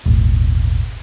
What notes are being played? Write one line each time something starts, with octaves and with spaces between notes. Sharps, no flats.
D#1 G#1